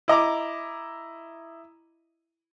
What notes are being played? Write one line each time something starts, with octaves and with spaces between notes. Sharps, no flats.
E4 D#5 A#5 D6